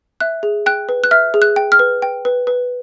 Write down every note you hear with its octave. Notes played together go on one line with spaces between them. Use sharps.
E5 F#6
G#4
G5 F#6
B4
F#6
E5 F6
G#4
F#6
G5
F6
B4
G5
B4
B4